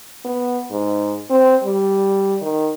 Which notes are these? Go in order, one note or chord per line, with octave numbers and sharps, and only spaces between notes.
B3
G#2
C4
G3
D#3